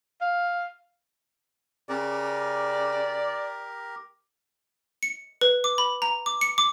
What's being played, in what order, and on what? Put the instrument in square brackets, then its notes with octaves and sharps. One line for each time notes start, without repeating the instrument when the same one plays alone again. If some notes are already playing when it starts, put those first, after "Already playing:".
[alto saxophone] F5
[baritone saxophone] C#3 [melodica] G4 A#4 [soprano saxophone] D5
[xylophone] C#7
B4
D6
B5
A#5
D6
C#7
D6